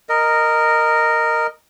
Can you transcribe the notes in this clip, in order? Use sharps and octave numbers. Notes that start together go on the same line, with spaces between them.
A#4 D#5